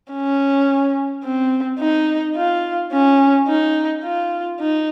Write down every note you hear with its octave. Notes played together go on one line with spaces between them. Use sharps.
C#4
C4
D#4
F4
C#4
D#4
F4
D#4